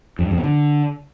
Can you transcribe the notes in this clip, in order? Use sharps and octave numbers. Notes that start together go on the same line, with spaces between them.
F2
G2
F2
B2
D3